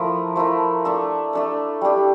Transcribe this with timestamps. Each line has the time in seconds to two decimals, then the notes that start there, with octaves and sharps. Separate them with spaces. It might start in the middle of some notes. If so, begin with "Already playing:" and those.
Already playing: F3 A3 E4 A#4
0.36 F3 A3 E4 A#4
0.85 A3 D4 A4 E5
1.33 A3 D4 A4 E5
1.81 G3 D4 G4